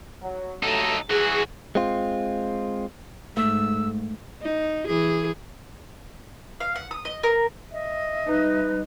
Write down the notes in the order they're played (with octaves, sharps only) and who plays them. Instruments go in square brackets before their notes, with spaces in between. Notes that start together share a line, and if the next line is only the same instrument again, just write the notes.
[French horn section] F#3
[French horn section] G2 F#3 A3 [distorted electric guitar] D#4 A4
[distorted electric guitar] E3 F#4 [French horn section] G#4
[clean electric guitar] G#3 C4 F4
[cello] G#2 [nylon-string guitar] A3 [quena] E6
[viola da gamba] D#4
E3 G#4
[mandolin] F5
F#5
D#6
D#5
A#4
[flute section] D#5 E5
[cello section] G3 D#4 [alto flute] B4